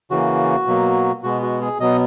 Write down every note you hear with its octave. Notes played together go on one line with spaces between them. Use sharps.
C#3 E3 A#3 F#4
B2 F#3 A#3
B2 G#3 B3 F#4
F#4
G#4
B2 F#3 B3 D#5